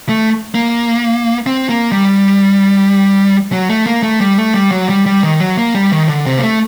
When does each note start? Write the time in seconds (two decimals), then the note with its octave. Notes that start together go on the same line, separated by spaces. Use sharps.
0.09 A3
0.55 A#3
1.46 C4
1.69 A#3
1.92 G3
3.52 F#3
3.70 A3
3.87 A#3
4.03 A3
4.20 G3
4.38 A3
4.54 G3
4.71 F#3
4.90 G3
5.06 G3
5.23 D#3
5.40 F#3
5.57 A#3
5.75 G3
5.92 D#3
6.09 D3
6.26 C3
6.38 A#3
6.43 A3